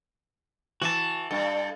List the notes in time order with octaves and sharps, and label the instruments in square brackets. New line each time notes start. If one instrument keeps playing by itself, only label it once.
[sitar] E3 [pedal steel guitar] F#4 A5
[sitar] G2 [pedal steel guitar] A4